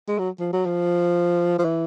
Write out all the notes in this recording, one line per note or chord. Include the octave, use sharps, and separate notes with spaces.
G#3
F#3
F3
F#3
F3
F3
E3